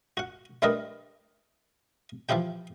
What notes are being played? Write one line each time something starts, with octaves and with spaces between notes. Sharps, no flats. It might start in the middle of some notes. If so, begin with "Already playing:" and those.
F#4 F#5
G3 A3 D4 A#4 B4 D#5
E3 F3 E4 G4 G5